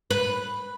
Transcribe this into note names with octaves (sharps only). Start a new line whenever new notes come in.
B4